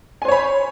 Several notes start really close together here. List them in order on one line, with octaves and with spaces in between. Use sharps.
G#5 C5 C#5 B5